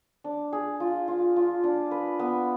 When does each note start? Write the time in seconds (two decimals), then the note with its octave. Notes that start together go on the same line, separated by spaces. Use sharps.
0.24 D4
0.53 G#4
0.80 F4
1.08 F4
1.36 F4
1.64 D4
1.91 B4
2.19 B3